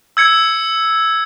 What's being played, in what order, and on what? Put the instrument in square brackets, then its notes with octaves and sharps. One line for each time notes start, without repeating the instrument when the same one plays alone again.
[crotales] E6 G#6 C#7